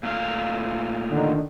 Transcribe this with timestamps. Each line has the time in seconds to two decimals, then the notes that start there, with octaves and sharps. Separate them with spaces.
0.03 A#2 A3 F5
1.10 D3 D#3